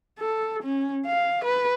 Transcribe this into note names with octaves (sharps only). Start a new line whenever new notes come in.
A4
C#4
F5
B4